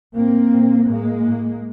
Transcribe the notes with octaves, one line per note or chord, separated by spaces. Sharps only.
A2 A#3 C4
A#2
A2 G#3 A#3
A2